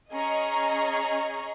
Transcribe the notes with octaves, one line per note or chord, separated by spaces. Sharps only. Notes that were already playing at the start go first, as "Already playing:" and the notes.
C#4 G#4 D#5 A#5 C#6